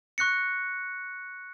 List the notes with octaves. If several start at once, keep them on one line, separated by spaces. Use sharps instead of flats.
C#6 F#6 A#6 C#7